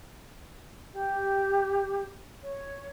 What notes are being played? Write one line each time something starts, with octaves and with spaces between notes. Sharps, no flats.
G4
C#5